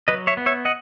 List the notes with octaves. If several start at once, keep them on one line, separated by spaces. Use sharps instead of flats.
F#3 B4 D#5
C#5 E5
B3
C#5 E5
D#5 F#5